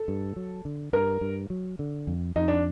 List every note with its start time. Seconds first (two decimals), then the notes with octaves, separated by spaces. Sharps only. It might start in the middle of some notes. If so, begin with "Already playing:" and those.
Already playing: A4
0.08 G2
0.36 F#3
0.65 D3
0.93 G2 A#4
1.21 G2
1.50 F#3
1.79 D3
2.07 F2
2.36 F2 D#4
2.48 D4